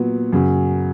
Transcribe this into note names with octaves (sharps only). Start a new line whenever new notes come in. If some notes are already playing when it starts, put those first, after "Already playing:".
Already playing: A#2 F#3 B3
F#2 C#3 F#3